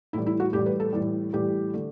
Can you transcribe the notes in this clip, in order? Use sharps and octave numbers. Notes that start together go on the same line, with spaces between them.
A2 E3 G3 E4
E4
F#4
A2 E3 G3 G4
B4
A4
A2 E3 G3
A2 E3 G3 G4
D3 A3